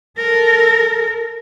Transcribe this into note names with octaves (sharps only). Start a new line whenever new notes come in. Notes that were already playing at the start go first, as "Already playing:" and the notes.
A4 A#4